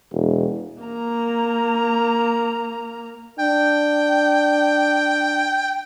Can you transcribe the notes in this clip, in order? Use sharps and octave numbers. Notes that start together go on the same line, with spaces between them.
E1
A#3 A#5
D4 G5